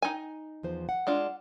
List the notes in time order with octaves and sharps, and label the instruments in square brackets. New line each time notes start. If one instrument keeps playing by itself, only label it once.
[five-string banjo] D#4 G#5
[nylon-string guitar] E2 F3 C5
F#5
[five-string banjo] G#3 D4 F4